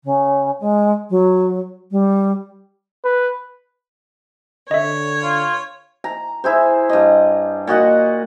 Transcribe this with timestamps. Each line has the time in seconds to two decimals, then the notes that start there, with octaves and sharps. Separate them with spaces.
0.04 C#3
0.60 G#3
1.10 F#3
1.91 G3
3.05 B4
4.71 D3 C#5 D#5 E5
5.23 F4
6.04 A#5
6.44 E4 G#4 C5
6.89 G2 D#5
7.67 A#2 F#4 D#5 F#5